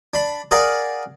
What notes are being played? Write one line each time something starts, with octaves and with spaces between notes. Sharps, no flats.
D4 B5
G#4 A#4 D5 F5 F#5 A#5